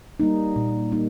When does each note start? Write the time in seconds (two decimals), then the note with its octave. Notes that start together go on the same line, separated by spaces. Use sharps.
0.20 G3 A#3 D#4
0.56 A#2
0.92 G3 A#3 D#4